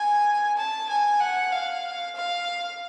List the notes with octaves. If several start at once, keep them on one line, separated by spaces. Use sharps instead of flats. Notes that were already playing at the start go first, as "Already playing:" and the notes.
Already playing: G#5
A5
G#5
F#5
F5
F5